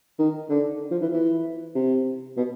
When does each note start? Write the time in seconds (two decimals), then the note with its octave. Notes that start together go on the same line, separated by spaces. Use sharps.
0.19 D#3
0.49 D3
0.91 F3
1.01 E3
1.13 E3
1.75 C3
2.37 B2